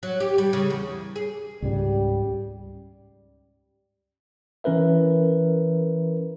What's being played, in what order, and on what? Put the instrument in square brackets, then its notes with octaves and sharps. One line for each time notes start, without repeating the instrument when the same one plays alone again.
[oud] F#3
G4
G3
C#3
E2
G#4
[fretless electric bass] C#2 G#2 C#3 [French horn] G3
[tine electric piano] E3 C#4 A#4 B4 E5